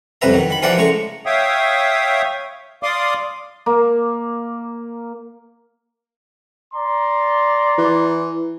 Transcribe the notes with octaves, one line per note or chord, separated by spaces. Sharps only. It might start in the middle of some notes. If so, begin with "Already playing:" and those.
C2 F2 B2 B4 E5 A#5
D#3 F#3
D#3 B5
E3 F3 G4 A#4 D5 F#5
C#3 G#3 A3 A#5 C#6
C#5 E5 F5 G5 D#6
D5 F5 C6 D6 D#6
A#3
D5 A#5 C6
E3